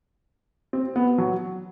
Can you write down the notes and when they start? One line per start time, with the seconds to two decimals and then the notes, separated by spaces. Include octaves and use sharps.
0.73 C4
0.96 B3
1.18 F#3